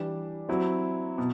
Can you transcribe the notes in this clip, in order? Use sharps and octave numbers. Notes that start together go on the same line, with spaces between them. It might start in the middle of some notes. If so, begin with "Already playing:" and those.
Already playing: E3 G3 D4 G4
F#3 C4 E4
B2